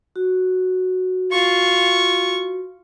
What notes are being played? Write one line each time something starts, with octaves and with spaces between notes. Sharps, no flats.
F#4
F4 C#6